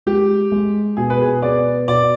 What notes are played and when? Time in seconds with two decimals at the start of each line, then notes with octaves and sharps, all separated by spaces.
0.06 G#3 G4
0.52 G#3
0.97 B2 G#4
1.10 B4
1.22 G#4
1.42 B3 D5
1.88 B2 D5